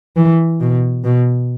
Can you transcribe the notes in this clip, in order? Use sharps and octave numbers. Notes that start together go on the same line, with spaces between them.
E3
B2
B2